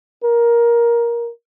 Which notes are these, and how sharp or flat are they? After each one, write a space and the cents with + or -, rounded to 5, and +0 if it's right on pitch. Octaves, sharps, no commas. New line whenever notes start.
A#4 +15